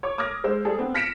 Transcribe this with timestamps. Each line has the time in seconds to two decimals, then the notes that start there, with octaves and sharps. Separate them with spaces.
0.03 C#5 D6
0.18 D6 D#6 F6 G#6 A#6
0.44 G#3 C5 E6
0.65 G3 G#4 A4
0.79 B3 C4
0.94 F6 A#6 B6 C#7 D7 E7